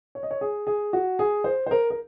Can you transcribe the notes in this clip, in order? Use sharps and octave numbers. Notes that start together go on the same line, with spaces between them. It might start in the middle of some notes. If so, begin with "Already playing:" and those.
C#5
D#5
C#5
G#4
G#4
F#4
G#4
C5
C5
A#4
A#4